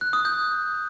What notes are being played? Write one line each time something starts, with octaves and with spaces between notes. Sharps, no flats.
F#6
D#6
G6